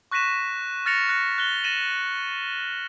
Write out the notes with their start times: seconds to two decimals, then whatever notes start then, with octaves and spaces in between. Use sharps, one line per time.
0.11 C#6 F#6 A#6 B6 D#7 E7
0.86 F6 A6 A#6 C#7 F7
1.09 F#6 A#6 C#7
1.38 F#6 G7
1.64 A6 A#6 D#7 E7 F#7